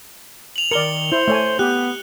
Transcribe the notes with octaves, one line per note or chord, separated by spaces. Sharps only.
F7 F#7
D#3 A#4 D5 C#7 G7
E4 C5
A3 C#5 G#5
B3 G4 F#6